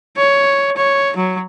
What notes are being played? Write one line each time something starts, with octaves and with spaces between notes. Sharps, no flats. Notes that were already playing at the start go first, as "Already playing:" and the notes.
C#5
C#5
F#3